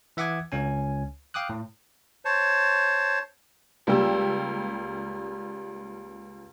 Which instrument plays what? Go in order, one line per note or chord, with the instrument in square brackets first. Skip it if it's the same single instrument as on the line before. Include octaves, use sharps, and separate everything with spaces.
[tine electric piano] E3 E5 F#5 D6 D#6 G#6
C#2 C#4 G#5
F5 G5 D6 D#6 F#6
A2
[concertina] C5 C#5 A5
[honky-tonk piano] C#2 G3 A#3 G5 E6